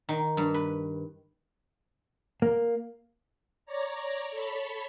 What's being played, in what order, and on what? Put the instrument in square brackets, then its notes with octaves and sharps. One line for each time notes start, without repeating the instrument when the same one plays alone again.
[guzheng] D#3
G2
B4
[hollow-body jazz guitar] A#3
[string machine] C#5 D5 A#5
A4 C#5 B5